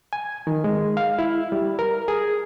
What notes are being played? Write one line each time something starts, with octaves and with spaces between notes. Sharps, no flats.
G#5
D#3
G#3
F5
E4
G3
A#4
G#4